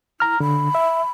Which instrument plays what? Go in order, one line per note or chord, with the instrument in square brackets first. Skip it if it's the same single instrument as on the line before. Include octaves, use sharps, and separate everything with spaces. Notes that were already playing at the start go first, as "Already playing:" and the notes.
[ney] E4 [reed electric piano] A#5 F6
[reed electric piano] D3 [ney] B5
[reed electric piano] E5